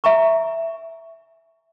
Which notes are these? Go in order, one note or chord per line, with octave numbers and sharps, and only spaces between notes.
E5 G#5 A#5 C#6